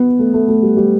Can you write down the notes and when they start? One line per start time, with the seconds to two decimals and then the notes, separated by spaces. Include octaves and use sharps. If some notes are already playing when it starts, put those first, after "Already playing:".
Already playing: B3
0.19 A3
0.34 A3
0.48 A3
0.62 G3
0.77 G3